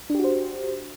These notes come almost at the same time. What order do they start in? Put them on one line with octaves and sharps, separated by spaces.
D4 G4 F#4 C5